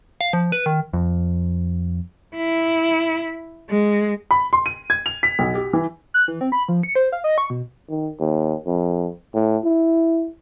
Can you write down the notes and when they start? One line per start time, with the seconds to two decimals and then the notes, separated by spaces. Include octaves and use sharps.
0.21 F5
0.33 F3
0.52 B4
0.66 D#3
0.93 F2
2.37 E4
3.69 G#3
4.31 B5
4.53 C6
4.66 D#7
4.90 G#6
5.06 F7
5.23 B6
5.39 B1
5.55 G4
5.73 E3
6.14 F#6
6.28 E3
6.41 C4
6.52 B5
6.69 F3
6.83 C#7
6.96 C5
7.12 F5
7.24 D#5
7.38 C#6
7.50 B2
7.90 D#3
8.20 D#2
8.66 F2
9.34 A2
9.64 E4